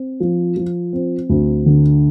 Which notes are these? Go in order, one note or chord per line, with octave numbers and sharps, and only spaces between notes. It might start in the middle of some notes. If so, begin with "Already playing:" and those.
Already playing: C4
F3
F3
C4
D2
D3